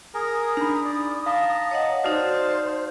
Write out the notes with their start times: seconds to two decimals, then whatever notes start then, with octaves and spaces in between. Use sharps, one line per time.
0.14 G#4 A#4 D#6
0.57 D4 D#4 B5
0.85 D5
1.26 F5 A5 A#5
1.71 C#5 D#5 F#5
2.04 D#4 F#4 C5 D5 F5 A5